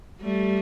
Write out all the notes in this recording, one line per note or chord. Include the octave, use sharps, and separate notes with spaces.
G3 A3